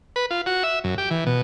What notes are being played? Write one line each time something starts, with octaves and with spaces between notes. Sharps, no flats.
B4
F4
F#4
E5
F#2
G4
E3
B2